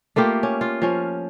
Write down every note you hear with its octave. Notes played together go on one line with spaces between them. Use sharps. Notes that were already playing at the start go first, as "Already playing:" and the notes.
A3 A#3 F4 G4
C#4
F4
F3 C#4